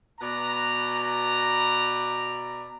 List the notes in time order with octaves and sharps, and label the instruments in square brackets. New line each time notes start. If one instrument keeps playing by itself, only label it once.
[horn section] B2 B4 D5 A#5